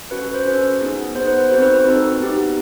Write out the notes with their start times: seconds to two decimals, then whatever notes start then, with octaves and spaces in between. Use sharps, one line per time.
0.11 C#4 F#4 A4 B4
0.34 C5
0.45 C#4 F#4 A4 B4
0.80 B3 D#4 G#4
1.15 B3 D#4 G#4 C5
1.27 B4
1.39 B4
1.50 C4 D#4 F#4 A4 C5
1.62 B4
1.73 B4
1.85 C4 D#4 F#4 A4 B4
2.20 B3 D#4 G4